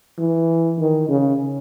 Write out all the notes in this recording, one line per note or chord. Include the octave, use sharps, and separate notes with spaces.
E3
D#3
C#3